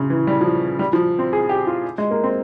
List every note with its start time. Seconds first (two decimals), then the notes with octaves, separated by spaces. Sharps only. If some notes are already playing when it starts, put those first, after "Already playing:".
Already playing: C#3
0.10 E3
0.27 G3
0.41 F3
0.79 G3
0.93 F3
1.19 C4
1.33 G#4
1.49 G4
1.67 F4
1.98 G#3
2.11 A#3
2.23 C4